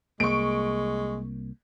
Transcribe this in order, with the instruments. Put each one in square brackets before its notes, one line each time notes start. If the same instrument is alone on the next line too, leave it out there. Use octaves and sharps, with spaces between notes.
[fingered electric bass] C2 A#3 [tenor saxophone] G#3 [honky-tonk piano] C#6 D7